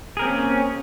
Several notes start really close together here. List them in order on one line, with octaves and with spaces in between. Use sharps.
G#4 A#4 C4 A#3 C#4